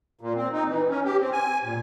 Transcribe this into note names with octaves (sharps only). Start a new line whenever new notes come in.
A#2
C4
D#4
E3
C#4
G4
C4
G#5
A#2